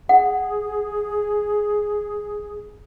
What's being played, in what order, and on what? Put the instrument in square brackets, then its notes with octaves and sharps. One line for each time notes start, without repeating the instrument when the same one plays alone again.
[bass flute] G#4 [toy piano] F#5